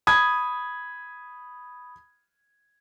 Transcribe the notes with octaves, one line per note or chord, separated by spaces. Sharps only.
B5 D#6 G#6